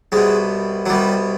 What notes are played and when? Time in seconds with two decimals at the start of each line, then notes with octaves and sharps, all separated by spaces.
0.12 C2 B2 G#3
0.86 F#3
0.89 C2 B2 G3